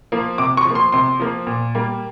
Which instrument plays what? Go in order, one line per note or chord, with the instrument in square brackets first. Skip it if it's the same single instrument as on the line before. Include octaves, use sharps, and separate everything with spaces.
[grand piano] F3 A#3
C3 D6
C#6
F3
A#3 C6
C3 C6
F3 A#3
A#2
G3 A#3